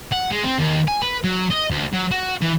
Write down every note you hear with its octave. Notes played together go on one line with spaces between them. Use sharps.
F#5
G#3
C4
D#2
G#5
B4
F#3
D#5
D2
F#3
F#4
E3